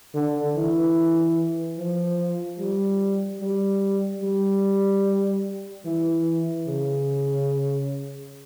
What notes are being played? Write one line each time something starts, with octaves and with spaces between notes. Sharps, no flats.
D3
E3
F3
G3
G3
G3
E3
C#3